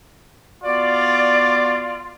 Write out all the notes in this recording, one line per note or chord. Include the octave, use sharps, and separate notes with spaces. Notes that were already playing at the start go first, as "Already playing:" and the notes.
B3 F4 F#4 D5